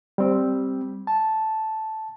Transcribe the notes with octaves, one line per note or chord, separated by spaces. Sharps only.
G3 C4
A5